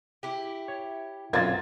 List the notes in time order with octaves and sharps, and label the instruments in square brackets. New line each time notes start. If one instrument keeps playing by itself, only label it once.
[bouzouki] E4 G4
[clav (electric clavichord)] C#5
[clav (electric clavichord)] B1 F#2 [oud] C4 F4 A#4 [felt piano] G#6 A6